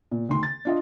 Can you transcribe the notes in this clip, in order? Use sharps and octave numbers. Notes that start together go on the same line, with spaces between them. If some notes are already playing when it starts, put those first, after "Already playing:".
A#2
D2 D#3 C6
A6
D4 F4 D#5